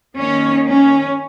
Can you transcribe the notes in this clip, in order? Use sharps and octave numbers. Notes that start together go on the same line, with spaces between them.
D#3 A#3 C#4
C#4